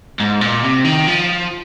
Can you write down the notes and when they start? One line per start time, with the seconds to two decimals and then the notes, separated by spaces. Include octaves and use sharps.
0.20 G#2
0.41 A#2
0.63 C3
0.85 D#3
1.07 F3